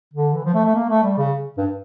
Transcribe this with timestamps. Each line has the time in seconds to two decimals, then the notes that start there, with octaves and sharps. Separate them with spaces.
0.13 D3
0.34 E3
0.45 F3
0.54 A3
0.65 A3
0.75 A#3
0.89 A3
1.03 G3
1.17 C#3
1.57 G2